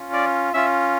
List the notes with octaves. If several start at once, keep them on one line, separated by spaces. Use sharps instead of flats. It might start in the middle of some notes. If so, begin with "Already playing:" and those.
Already playing: C#4 F4
D5
C#4 F4 E5